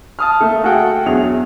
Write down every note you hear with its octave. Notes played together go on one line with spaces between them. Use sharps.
A5 D#6 F6
A3 A#3 A4
A3 F#4 G#4 A4 F#5 G5
E2 F#3 D4 E4 G#4 F7